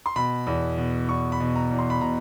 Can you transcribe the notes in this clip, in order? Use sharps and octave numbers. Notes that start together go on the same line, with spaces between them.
C6
B2 B5
E2
B2
E2 C#6
B5
B2
A#5
E2
C6
B5
B2 A#5